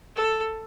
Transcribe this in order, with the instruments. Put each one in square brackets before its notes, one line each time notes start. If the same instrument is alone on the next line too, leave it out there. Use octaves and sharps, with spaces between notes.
[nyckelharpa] A4